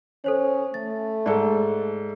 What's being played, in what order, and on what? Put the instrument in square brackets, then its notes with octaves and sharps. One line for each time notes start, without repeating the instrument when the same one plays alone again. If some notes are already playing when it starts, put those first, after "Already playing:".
[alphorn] C#4 [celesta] A4 C5 C#5
[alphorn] A3 [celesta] A6
[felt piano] G#2 A4 [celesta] D5